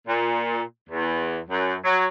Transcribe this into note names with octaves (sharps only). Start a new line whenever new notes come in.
A#2
E2
F#2
F#3